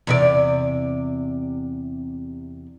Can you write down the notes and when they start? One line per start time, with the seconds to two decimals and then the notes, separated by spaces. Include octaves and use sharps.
0.07 E2 C3 D5